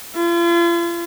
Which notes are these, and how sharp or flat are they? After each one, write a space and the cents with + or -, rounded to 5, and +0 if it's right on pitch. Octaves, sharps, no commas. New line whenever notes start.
F4 -40